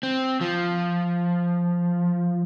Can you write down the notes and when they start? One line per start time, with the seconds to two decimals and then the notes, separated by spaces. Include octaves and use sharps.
0.03 C4
0.41 F3